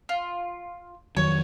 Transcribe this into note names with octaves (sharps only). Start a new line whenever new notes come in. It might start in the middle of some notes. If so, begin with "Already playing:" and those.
F4
F2 D#3 F#3 C#5